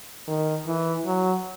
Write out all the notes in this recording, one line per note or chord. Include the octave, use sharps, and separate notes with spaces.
D#3
E3
F#3